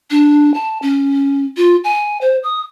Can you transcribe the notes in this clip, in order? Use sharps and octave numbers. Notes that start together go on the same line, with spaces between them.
D4
A5
C#4
F4
G#5
C5
D#6